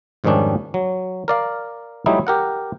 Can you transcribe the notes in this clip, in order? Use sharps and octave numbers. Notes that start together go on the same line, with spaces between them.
F2 G#2 D#3 G3 C#4 D4
F#3
A#4 D5 F5
F#3 G3 A3 D#4 E4
G4 A#4 F#5